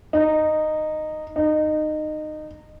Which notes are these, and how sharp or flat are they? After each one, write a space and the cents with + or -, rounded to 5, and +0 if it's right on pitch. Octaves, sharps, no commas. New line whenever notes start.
D#4 -10
D#4 -20